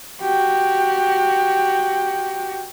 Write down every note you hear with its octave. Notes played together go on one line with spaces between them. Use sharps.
F#4 G4